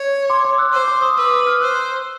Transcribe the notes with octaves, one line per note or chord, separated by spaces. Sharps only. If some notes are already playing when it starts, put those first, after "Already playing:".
Already playing: C#5
C6 D6
C6 D6
E6 F#6
C5 D6 E6
C6 D6
C#6 D#6
B4 D6 E6
D6 E6
D#6 F6
C5 E6 F#6